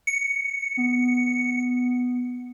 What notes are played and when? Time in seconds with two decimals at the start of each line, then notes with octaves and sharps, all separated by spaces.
0.07 C#7
0.77 B3